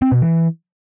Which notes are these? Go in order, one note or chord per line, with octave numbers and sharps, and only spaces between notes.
C4
B2
E3